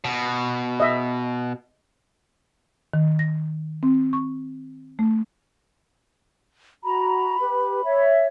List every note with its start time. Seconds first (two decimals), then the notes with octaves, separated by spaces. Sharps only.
0.04 B2
0.80 D#5 E5
2.94 D#3
3.19 A#6
3.83 C4
4.13 C#6
4.99 A3
6.84 F#4 A#5 B5
7.41 G4 B4
7.84 C#5 E5